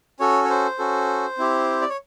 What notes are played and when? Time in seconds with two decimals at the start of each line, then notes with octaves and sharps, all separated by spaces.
0.20 C#4 F#4 A4 C#5
0.45 C#5
0.50 C5
0.79 C#4 F#4 A4
1.38 C4 E4 G4
1.81 D5
1.89 C#5